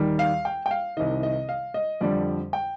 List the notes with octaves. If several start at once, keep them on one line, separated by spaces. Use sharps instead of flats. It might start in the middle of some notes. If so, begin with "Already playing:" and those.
Already playing: D#2 D#3 G3
F5
G5
G5
F5
C2 C3 D#3 D#5
D#5
F5
D#5
F2 D3 G3 D5
G5